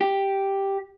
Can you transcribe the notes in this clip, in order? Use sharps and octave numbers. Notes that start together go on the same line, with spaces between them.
G4